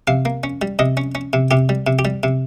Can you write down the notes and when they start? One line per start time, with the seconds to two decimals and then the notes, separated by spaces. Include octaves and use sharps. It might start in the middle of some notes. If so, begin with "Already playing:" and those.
0.07 C3 F5
0.25 A#3
0.44 C#4
0.62 G3
0.79 C3 D#5
0.97 C#4
1.15 C#4
1.33 C3
1.51 C3 G4
1.69 G3
1.87 C3
1.99 G4
2.05 G3
2.23 C3